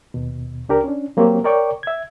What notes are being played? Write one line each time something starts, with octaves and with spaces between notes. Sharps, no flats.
D#2 B2
C#2 D4 G4 A#4
C#4 D4
F#3 A#3 C4 G4 C#5
A#4 C#5 D5 G5 C#6 D6
E5 G#6